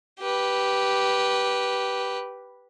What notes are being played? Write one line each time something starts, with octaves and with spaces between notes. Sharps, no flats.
G4 B4